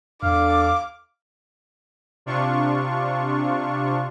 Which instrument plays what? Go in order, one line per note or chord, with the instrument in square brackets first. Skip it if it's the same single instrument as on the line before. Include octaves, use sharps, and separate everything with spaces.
[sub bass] E2 [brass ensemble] D4 A4 [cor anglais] F5 [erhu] D6
[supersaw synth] C3 D4 F4 C#6